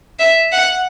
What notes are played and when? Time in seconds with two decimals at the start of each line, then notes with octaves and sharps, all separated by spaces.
0.19 E5
0.52 F#5